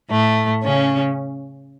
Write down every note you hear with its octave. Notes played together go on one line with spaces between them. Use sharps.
A2 A3
C#3 C#4